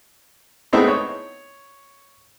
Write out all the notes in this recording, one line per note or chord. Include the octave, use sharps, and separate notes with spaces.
G#3 A3 B3 C4 D#4 E4
C#5